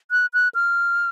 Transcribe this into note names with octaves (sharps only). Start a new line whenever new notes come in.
F#6
F#6
F6